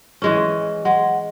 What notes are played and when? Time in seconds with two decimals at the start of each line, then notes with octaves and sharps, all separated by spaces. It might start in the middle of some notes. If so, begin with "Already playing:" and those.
0.22 E3 G#3 C#4
0.85 G#3 F#5